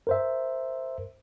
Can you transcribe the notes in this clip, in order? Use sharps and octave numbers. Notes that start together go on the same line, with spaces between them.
A#4 C5 E5